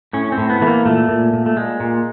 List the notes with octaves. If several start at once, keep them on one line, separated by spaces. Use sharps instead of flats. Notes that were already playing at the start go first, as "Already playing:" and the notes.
A2 C#4
C4
A2
B3
E3 A3
A#3
A#2 A3
A#2
A#2
A3
A#2 G#3
A#2